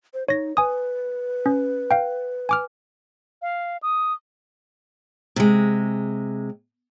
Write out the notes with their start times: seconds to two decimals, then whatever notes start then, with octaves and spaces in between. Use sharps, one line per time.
0.14 C5
0.28 D#4 C#5 A#6
0.57 B4 G#5 D#6
1.46 C#4
1.91 F5 G5
2.49 G#5 D6 F6
3.42 F5
3.83 D#6
5.36 C3 G#3